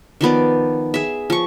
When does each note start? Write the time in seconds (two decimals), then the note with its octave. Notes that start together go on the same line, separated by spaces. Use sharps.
0.21 D#3 F3 B3 D5
0.94 G#4 E5
1.30 F3 C#6